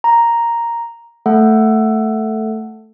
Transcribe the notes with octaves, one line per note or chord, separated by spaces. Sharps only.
A#5
A3 A4 F#5